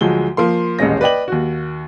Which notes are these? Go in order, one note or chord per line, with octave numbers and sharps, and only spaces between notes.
D2 F3 F#3 G#3 G7
F3 A#3 C6
D#1 A1 G#3 C#4 A#6
B4 D5 D#5 G5 F#7
D#2 F#4